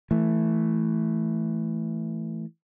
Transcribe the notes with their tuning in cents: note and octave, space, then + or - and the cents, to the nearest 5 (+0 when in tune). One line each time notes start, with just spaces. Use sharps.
E3 +0 A3 +0